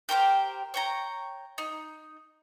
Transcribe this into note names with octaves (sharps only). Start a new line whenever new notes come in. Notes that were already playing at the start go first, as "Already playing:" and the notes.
G4 A#4 C5 G5
C#5 G5 A#5
D#4